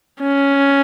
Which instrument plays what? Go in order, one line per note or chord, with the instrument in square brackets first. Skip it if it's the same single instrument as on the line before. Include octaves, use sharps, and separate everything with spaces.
[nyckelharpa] C#4